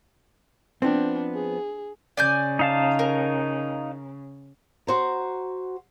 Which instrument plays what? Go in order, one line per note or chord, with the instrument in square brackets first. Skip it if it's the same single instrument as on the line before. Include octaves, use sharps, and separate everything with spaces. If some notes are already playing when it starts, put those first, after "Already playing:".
[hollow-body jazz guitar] F3 B3 C4 [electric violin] D4
[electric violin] G#4
[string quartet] C#3 [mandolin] D5 G#5 G6
[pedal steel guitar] D#4 F5 A5
[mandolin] A#4
[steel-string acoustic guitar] F#4 C5 A#5